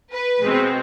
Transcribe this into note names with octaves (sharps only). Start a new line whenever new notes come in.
B4
B2 G#3 C4